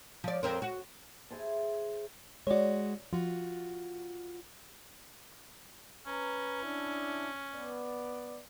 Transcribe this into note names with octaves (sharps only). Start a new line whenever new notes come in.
F3 D5
F2 C4 A#4
F#4
E4 G#4 C5 A5
G#3 F#4 C#5 D5
F3 F4 F#4
C#4 B4 A#5
D4 E4
B3 D5